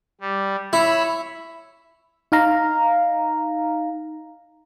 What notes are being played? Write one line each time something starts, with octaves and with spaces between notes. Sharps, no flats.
G3
E4 C#5 B5 E6
D#4 F5 A#5